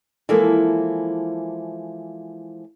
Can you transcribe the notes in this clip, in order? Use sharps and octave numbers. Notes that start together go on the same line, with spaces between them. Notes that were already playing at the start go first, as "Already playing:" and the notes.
E3 F3 G#3 A#3 E4 A4